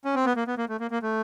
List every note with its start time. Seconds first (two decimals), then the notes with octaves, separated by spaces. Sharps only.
0.05 C#4
0.15 C4
0.26 B3
0.36 A#3
0.47 B3
0.58 A#3
0.69 A3
0.80 A#3
0.91 A#3
1.02 A3